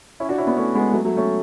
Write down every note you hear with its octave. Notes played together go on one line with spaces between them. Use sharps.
C#4 E4
D4 F#4
C#4 E4
B3 D4
A3 C#4
G#3 B3
F#3 A3
F#3 A3
A3 C#4